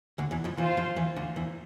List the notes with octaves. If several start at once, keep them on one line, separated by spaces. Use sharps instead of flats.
D2 D3
E2 E3
F2 F3
E2 E3 F4 C5 F5
F2 F3
E2 E3
D2 D3
E2 E3